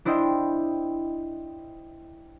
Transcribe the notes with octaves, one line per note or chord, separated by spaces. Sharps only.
D4 E4 C5 D#5 G5